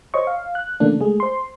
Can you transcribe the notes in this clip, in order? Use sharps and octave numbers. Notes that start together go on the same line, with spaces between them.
C5 C#5 D#5 C#6
F5
F#6
C#3 E3 A3 A#3 D4
G#3 A3 G#4
C5 C6